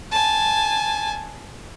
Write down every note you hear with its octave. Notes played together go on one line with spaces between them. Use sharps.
G#5 A5